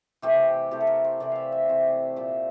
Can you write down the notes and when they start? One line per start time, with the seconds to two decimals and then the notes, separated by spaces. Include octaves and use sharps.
0.22 C3 E3 A3 C4 G4
0.71 C3 E3 A3 C4 G4
0.81 A4
0.87 A#4
1.04 C5
1.20 C3 E3 A3 C4 D5
1.32 E5 F5
1.52 E5
1.69 C3 E3 A3 C4
2.16 A#2 A3 C4 E5